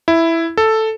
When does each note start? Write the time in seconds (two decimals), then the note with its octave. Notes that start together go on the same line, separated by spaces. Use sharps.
0.08 E4
0.57 A4